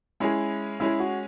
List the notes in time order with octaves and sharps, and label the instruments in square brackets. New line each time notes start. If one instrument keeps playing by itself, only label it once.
[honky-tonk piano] G#3 C#4 G#4 [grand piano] E4
[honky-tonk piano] G#3 C#4 G#4 [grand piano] E4
[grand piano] F#4